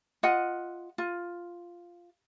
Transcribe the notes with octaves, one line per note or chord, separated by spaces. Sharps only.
F4 D#5 F#5
F4